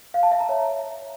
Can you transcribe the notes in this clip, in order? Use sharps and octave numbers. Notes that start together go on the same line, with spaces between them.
F5
A5
E5
A#5
C#5